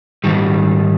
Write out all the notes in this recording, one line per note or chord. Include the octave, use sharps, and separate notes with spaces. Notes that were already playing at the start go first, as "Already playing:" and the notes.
G#2 D#3 G3